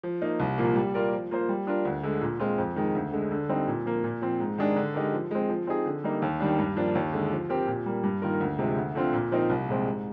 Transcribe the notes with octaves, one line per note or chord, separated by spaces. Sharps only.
F3
A#3 D#4
C2
A#2 F3 A#3
G3
A#3 F4 A#4 D5
F3
A#3 F4 C5
G3
D4 F4 A#4
D2
D3 G#3
A#2
G#3 C4 F4
F2
D#3 G#3
D2
D3 G#3
D3
G3 C4 D#4
A#2
F3 A#3
A#2
F3 C4
G#2
D#3 G#3 D4 G#4
D3
G#3 D#4 G4 A#4
F3
G#3 C4
F3
C4 D#4 G#4
D3
G3 A#3 D#4
D#2
D#3 G3 D4
G2
F3 A#3 D4
D#2
D3 G#3
F3
C4 G4 A#4
A#2
G3 A#3
G2
D#3 A#3 F4 A#4
D2
C3 F3 G#3
D2
D3 F3 C4 F4
A#2
F3 C4 D#4 A#4
C2
A#2 F3 G#3 C4
G#2